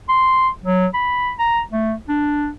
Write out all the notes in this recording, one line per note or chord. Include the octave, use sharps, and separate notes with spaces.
C6
F#3
B5
A#5
A3
D4